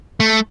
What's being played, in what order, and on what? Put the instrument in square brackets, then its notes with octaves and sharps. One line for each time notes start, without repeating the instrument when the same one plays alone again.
[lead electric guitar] A3